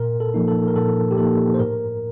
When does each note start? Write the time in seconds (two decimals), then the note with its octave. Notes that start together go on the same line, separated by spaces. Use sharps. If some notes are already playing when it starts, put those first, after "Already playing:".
Already playing: A#2 A#4
0.20 A4
0.34 F3 A#3 D#4
0.48 A4
0.68 A#4
0.76 A#2 A4
1.11 G4
1.18 F3 A#3 D#4 A4
1.54 C5
1.59 A2 A#4